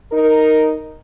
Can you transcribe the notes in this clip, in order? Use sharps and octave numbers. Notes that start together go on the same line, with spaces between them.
D#4 A#4